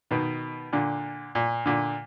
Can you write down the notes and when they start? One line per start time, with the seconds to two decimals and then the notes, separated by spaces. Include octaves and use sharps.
0.11 B2 D#3
0.73 A#2 D3
1.35 A#2
1.66 A#2 D3